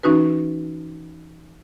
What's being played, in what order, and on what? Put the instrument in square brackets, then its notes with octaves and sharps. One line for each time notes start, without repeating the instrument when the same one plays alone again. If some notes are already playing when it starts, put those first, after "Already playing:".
[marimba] E3 C#4 D#4 F#4 B4